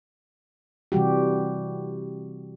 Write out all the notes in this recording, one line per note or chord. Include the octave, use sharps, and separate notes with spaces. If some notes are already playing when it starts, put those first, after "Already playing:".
C3 E3 G3 F#4 G4